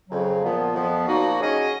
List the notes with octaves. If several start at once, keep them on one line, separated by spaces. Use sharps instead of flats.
F2 C#3 F#3
A#2 F3 B3
F2 F3 B3
A#2 F3 A#3 D#4 F#4
C#3 F#3 C#4 G#4 D#5